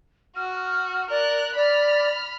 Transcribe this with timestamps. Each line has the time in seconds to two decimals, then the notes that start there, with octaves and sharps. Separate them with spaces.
0.36 F#4 F6
1.10 A#4 D5 F#6
1.56 D5 B5 F6